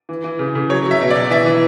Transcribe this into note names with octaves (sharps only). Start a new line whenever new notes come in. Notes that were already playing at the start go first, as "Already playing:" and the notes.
E3
E3
C#3
C#3
F#3 C#5
F#3
E5
B2
D5
B2
E3 E5
E3